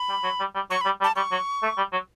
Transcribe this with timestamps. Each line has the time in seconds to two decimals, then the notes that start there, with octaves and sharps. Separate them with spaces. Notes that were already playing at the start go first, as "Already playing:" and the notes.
Already playing: B5
0.09 G3
0.23 F#3
0.40 G3
0.55 G3
0.70 F#3 C#6
0.81 B5
0.85 G3
1.01 G3
1.04 A5
1.16 G3 C#6
1.32 F#3
1.63 A3
1.77 G3
1.92 F#3